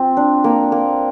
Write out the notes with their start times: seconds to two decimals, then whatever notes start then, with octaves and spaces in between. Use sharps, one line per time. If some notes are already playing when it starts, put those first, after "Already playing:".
Already playing: C4 F4
0.17 D4
0.44 A#3
0.72 A#3